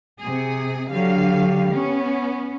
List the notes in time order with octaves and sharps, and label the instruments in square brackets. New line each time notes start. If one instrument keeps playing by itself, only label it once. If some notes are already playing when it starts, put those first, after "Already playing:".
[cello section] C3 G#4
[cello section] D3 F#3 F5 [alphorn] G4
[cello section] B3 C#4